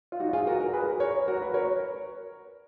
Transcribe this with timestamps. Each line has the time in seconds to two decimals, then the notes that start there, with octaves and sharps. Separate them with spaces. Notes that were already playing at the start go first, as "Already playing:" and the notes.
0.12 F4
0.20 D#4 F#4
0.33 F4 G#4
0.47 F#4 A#4
0.60 F#4 A#4
0.73 G#4 B4
1.00 A#4 C#5
1.28 F#4 A#4
1.42 B4
1.54 A#4 C#5